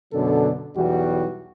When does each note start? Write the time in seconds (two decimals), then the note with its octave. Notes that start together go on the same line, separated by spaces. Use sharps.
0.12 F#2 B2 D3 F#3 D4 A4
0.76 B1 E2 E3 G3 F#4